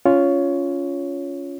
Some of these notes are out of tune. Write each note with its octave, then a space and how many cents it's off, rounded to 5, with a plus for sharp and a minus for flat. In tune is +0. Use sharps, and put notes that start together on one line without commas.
C#4 +15 F4 +0 C#5 +10